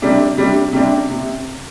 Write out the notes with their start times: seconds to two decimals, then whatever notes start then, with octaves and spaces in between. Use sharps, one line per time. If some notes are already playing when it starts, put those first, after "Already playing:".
0.02 C3 G3 D4
0.37 C3 G3 D4
0.73 C3 G3 D4
1.09 C3